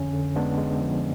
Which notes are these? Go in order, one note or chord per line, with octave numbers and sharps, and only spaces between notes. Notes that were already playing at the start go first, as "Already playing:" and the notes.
Already playing: F2 D3 C#4
D3
G#3 B3 D4
G#3
F3